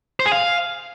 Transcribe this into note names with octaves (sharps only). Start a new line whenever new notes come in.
C5
G#4
F5